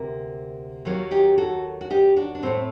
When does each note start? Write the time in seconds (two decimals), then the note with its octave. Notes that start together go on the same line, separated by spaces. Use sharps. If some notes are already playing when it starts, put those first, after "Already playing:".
Already playing: D2 C3 A#3 A#4
0.85 D#2 D#3 F#3 A#3
1.11 D#4 G4
1.38 F#4 A4
1.81 F#4
1.90 D#4 G4
2.16 D4 F#4
2.35 D4
2.43 A2 A3 C4